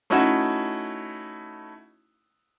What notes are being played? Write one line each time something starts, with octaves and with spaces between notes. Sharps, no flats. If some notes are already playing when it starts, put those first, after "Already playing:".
A3 C#4 D#4 E4 F#4